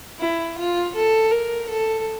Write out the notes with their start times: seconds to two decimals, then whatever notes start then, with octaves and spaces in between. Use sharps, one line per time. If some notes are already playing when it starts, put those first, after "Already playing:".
0.19 E4
0.57 F4
0.95 A4
1.31 A#4
1.69 A4